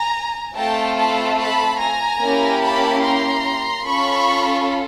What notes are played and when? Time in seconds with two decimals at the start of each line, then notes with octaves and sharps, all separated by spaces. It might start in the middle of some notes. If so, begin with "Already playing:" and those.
Already playing: G#5 A#5
0.56 A3 C4 F4 A4 G5 A5
0.98 A5 B5
1.39 A5 B5
1.79 G#5 A#5
2.20 A#3 C#4 E4 G4
2.62 A5 B5
3.02 A#5 C6
3.85 C#4 F4 A4 B5 C#6